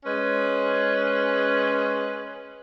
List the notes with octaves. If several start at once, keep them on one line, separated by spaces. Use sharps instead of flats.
G#3 C#4 B4